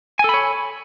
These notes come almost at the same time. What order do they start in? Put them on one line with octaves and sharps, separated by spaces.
G#5 A4 B5 C#5